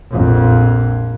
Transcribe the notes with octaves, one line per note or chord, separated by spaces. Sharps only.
A#1 F2